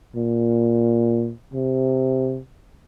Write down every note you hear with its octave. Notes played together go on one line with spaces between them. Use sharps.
A#2
C3